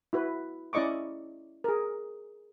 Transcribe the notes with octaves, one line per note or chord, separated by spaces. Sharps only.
E4 F#4 B4
C#4 E4 D5 D#5 C#6 D6
G#4 A#4